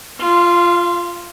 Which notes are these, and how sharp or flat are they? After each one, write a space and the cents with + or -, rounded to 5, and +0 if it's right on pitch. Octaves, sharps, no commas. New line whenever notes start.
F4 -5 F5 -30